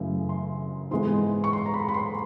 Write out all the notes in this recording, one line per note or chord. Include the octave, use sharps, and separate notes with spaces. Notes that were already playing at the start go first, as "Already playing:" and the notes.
Already playing: F#2 C#3 E3 A3
C6
G#2 E3 G#3 B3 C6
C#6
C6
A#5
B5
B5
C6